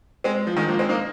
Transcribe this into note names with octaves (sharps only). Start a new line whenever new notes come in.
G#3 C4
F3
D#3 G#3
F3 A#3
G#3 C4
A#3 D#4